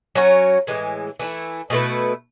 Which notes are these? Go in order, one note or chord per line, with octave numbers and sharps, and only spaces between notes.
F#3 C#4 F#4 C#5
A2 E3 G#3
E3 A3 E4
B2 A3 E4 B4